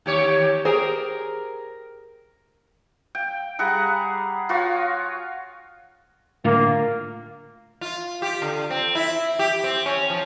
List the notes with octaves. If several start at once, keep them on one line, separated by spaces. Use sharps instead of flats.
D#2 G4 C#5
G4 G#4 A#4 C5
G5
G3 G#4 F#5 A#5
F4 F#4 C#5
A2 D3 A#3 F4
F4
G4
D3
C4
E4
G4
C4
C#4
F3